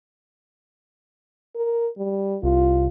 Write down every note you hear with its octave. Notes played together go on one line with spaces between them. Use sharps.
A#4
G3
C2 F4